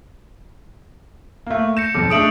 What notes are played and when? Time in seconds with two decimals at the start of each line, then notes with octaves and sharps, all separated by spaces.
1.46 A3 A#3
1.77 G6 A#6 C#7 E7
1.94 B1 F2 D6
2.10 G#3 A3 D4 D#6 D7 F#7